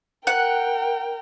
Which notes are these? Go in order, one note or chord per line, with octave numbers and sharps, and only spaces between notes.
A#4 F#5 G5